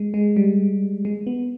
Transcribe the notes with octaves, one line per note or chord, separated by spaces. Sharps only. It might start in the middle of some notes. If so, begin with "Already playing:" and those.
Already playing: G#3
G#3
G3
G#3
B3